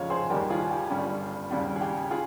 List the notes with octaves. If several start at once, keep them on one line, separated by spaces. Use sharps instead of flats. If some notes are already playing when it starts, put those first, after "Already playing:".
Already playing: F1 D#2 C#3 F3 G#3 C#5 F5
G#4 C5
D#2 D#3 G3 G4 A#4
F4 G#4
G4
G1 G2 G3 C#4
D#2 C#3 G3
G#4
G4
F4 G#4